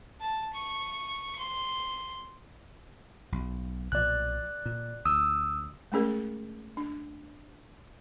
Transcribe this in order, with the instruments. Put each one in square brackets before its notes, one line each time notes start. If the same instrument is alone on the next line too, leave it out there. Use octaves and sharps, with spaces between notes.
[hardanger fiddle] A5
C#6
C6
[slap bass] B1
[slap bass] B1 A#2 F3 [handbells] D5 F#6
[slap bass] A#2
[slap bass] D2 [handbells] D#6 E6
[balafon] G#3 A3 C#4 G#4 A#4
D4